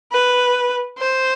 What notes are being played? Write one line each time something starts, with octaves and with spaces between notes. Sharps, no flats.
B4
C5